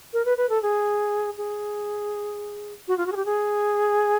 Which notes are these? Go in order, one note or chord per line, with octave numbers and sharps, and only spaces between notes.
A#4
B4
B4
A4
G#4
G#4
F#4
F4
F#4
G#4
G4
G#4